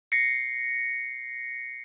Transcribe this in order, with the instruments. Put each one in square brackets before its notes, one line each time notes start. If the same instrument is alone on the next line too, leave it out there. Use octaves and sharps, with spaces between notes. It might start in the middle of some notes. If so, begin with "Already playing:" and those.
[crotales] A#6 C7 C#7